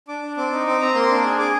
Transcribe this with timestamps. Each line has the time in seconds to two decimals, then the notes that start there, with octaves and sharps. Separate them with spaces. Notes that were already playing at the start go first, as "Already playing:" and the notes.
0.08 D4 D6
0.22 D4
0.37 C4 D6
0.52 D#4
0.66 C4 D6
0.80 C4 A#5
0.95 A#3 C6
1.10 D4 D6
1.24 G#4
1.39 G#4 D6